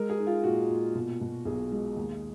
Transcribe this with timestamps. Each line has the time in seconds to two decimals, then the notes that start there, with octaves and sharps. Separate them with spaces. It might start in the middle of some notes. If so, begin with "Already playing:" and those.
Already playing: G#3 A#4
0.10 G#4
0.18 D#4
0.27 F4
0.43 A#2 F#4
0.69 A#2
0.95 B2
1.21 B2
1.45 B1 G#4
1.71 G#3
1.97 D#2